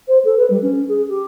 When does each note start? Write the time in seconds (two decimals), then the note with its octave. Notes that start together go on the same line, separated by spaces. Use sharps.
0.08 C5
0.24 A4
0.37 B4
0.50 G3
0.62 C#4
0.88 G#4
1.08 G4